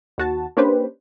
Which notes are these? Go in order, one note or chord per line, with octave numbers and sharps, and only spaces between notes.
D#2 F#4 A5
A#3 C#4 D4 G4 B4 C5